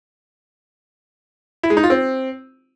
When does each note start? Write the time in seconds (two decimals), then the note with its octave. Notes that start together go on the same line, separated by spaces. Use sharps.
1.63 E4
1.70 G#3
1.77 D#4
1.83 F4
1.90 C4